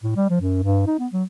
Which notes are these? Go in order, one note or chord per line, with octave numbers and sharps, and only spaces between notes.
A2
G3
F3
F#2
G2
D#4
B3
F#3